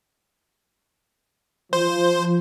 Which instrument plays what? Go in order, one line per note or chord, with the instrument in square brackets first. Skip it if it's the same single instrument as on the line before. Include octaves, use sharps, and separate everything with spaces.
[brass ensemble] F3 [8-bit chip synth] C5